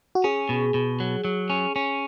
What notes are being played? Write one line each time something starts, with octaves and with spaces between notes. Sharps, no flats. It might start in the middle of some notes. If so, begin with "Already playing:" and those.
F#4
C#4 G#4
B2
B2
F#3
F#3
C#4
C#4